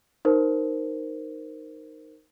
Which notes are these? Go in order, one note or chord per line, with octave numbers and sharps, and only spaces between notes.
D#4 A#4 C5